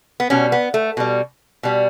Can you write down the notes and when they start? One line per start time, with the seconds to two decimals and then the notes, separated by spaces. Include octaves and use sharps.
0.20 B3
0.30 B2 G3 C#4
0.52 B3
0.74 A3
0.97 B2 G3
1.63 B2 G3